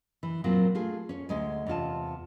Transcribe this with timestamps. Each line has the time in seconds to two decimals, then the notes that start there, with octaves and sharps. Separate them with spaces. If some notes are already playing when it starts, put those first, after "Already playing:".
0.23 E3
0.44 A#2 F#3 A#3 C4 F4
0.75 A3 F4 G#4
1.09 C#4 C#5
1.29 D2 G#3 G#5
1.67 E2 C3 F4 A5